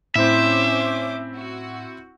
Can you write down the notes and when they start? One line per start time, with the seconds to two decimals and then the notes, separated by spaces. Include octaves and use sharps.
0.16 A2 C4 C#4 E4 C5 E5 D6
1.37 F#4